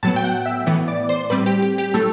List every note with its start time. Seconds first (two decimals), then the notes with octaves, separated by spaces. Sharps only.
0.03 A2 F#3 B3 A5
0.16 G5
0.24 F#5
0.46 E5
0.66 A2 E3 B3
0.88 D5
1.09 C5
1.30 A2 G3 C4 B4
1.46 G4
1.62 G4
1.78 G4
1.94 A2 F#3 A3 A4